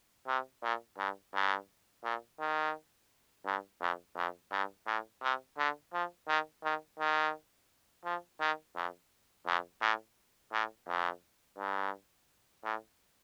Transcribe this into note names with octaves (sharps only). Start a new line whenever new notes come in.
C3
A#2
G2
G2
A#2
D#3
G2
F2
F2
G2
A2
C3
D3
F3
D#3
D#3
D#3
F3
D#3
F2
F2
A2
A2
F2
G2
A2